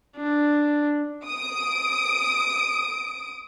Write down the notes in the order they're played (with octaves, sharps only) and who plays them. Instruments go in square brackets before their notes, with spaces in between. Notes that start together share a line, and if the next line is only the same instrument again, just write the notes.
[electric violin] D4
[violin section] D#6 D7